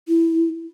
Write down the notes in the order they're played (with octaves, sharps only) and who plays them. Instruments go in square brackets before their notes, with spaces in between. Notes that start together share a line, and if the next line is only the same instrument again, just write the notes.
[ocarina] E4